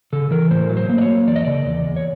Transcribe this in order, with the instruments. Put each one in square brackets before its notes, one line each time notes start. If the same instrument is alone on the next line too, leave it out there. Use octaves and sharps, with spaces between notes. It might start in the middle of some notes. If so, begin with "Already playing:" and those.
[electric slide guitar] C#3 A4
E3 A#4
A2 C5
F#3
C5
A#3
D5
C#5
A#3
E2 D5
D#5
C#3 D5
E2
E2
C#5